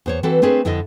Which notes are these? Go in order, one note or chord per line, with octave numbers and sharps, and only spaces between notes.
E2 C5 C#5
E3 C4 F#4 A4 B4
A3 C4 D4 G#4 A#4 B4
F2 D3 E4 A4 D#5